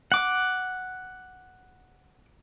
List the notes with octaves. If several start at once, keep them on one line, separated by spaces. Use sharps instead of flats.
F#5 D6